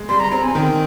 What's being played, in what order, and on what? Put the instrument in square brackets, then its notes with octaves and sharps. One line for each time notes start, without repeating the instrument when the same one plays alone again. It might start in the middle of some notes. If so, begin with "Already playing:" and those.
Already playing: [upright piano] G#3
[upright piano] G3 [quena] C6
[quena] A#5
[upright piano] C4 [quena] A#5
[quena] G#5
[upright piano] D#3 [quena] G5